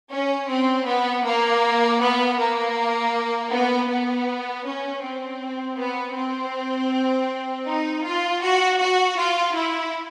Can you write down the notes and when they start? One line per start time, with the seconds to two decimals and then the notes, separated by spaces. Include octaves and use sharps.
0.11 C#4
0.48 C4
0.86 B3
1.25 A#3
2.01 B3
2.38 A#3
3.52 B3
3.89 B3
4.64 C#4
5.03 C4
5.77 B3
6.15 C4
7.66 D#4
8.04 F4
8.42 F#4
8.79 F#4
9.17 F4
9.55 E4